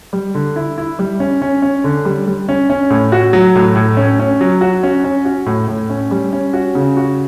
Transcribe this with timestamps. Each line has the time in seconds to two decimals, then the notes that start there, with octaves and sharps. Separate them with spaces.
0.13 G3
0.35 D3
0.56 E4
0.78 E4
0.99 G3
1.20 C#4
1.42 C#4
1.62 C#4
1.84 D3
2.05 G3
2.27 G3
2.49 C#4
2.70 C#4
2.90 A2
3.12 F#4
3.33 F#3
3.55 A2
3.76 A2
3.97 C#4
4.19 C#4
4.41 F#3
4.61 F#4
4.83 C#4
5.04 C#4
5.25 F#4
5.46 A2
5.68 A2
5.90 C#4
6.11 G3
6.33 C#4
6.53 F#4
6.75 C#3
6.97 F#4